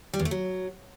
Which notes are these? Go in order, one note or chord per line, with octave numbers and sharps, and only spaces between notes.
G3
E2
A3
F#3